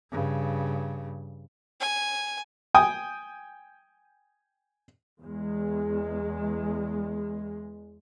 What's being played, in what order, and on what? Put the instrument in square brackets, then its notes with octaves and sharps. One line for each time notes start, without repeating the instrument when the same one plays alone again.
[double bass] G2 C#3
[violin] G#5
[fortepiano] G5 G#5 D#6
[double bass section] E2 G#3